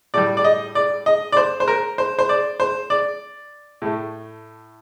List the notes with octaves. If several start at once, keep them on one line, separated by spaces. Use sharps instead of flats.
A2 G3 D5
D5
D#5
D5
D#5
D5
C5
C5
A#4
C5
C5
D5
C5
D5
A2 A3